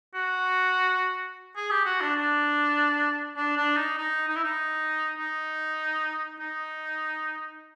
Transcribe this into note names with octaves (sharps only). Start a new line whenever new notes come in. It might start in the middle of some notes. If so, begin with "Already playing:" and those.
F#4
G#4
G4
F#4
D4
D4
D4
D4
D#4
D#4
D#4
E4
D#4
D#4
D#4